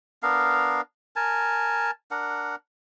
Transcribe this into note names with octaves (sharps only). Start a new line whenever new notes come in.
B3 D4 A#4 F5
A#4 G#5 A5
D4 A#4 F#5